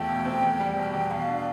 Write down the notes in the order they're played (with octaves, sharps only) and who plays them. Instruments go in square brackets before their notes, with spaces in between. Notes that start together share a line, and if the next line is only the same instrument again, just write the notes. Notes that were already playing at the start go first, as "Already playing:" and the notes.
Already playing: [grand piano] E2 A3 F4 [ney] G5
[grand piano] B2
C4
E2
G3
B2
E2
[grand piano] B2 [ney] F5
[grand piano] D4